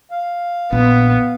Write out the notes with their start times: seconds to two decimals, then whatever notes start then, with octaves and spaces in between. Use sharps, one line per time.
0.11 F5
0.73 A#1 A#2 B3